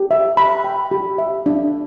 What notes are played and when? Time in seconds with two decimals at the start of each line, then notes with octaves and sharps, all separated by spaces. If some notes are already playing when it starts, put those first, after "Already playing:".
Already playing: G4
0.11 E5
0.37 B5
0.64 G5
0.91 G4
1.18 E5
1.46 D4